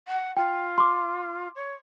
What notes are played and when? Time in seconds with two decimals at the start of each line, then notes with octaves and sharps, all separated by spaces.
0.08 F#5
0.37 F4 G5
0.78 C6 D6
1.56 C#5